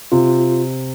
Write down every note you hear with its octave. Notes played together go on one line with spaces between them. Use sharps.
C3 F4